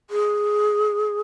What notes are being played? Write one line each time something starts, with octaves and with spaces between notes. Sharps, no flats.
G#4